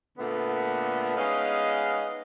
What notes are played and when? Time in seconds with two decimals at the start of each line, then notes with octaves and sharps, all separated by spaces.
0.18 A#2 D3 A3 B3
1.17 G#3 B3 C#4 D#4 D#5 F5